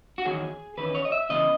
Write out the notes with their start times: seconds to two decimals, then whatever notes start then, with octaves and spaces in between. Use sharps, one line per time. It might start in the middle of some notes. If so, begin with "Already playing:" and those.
0.18 F#4
0.25 E2 D#3 F#3 G#4
0.77 E2 D#3 C#4 B4
0.95 C#5
1.05 D#5
1.12 E5
1.29 C#3 E3 B3 D#5